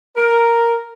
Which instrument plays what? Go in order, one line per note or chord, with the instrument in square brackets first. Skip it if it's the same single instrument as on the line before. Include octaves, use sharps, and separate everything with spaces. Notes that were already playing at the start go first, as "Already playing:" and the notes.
[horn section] A#4